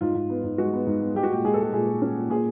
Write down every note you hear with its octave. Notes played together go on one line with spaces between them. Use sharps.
G#2 F4
G#2
B3
G#2
G#3 F#4
B3
G#2
B3
G#3 G4
F#4
A#2 G4
G#3 G#4
A4
G#3 G#4
A#2 G#4
A#2
C#4
A#2
A#2 G#4